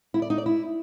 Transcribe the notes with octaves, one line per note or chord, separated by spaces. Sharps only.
E4
D5
D#4
D5
E4